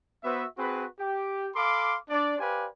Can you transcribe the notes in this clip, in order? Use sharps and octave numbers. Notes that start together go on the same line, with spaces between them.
B3 F#4 B4 C5 E5
C4 F#4 G#4 B4
G4
A4 F5 B5 C6 D6
D4 D5
G4 B4 C5 D5 F5 G#5